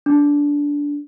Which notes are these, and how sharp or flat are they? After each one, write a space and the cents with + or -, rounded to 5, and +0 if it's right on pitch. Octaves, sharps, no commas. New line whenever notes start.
D4 -15